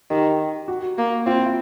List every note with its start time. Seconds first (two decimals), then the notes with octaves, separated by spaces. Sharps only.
0.11 D#3 G4
0.68 F#4
0.98 A#3
1.26 C4 F4
1.36 E4
1.46 F4